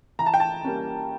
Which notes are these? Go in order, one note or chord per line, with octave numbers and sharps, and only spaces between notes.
E3 A#5
A5
G5
A5
G3 A#3 C#4